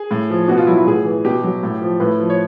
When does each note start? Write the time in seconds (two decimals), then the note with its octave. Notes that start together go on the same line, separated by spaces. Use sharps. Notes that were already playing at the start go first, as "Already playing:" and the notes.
Already playing: G#4
0.11 A2
0.30 F3
0.48 B2 F#4
0.58 F4
0.67 F#3 E4
0.78 E4
0.86 A2 G#4
1.05 E3
1.25 B2 G4
1.44 F#3
1.63 A2
1.82 F3
2.00 A2 B4
2.19 F3
2.30 C#5